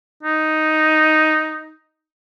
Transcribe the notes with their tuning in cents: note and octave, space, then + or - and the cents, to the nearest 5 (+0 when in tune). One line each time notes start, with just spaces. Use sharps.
D#4 +0